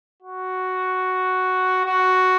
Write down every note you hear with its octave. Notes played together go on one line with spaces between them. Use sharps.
F#4
F#4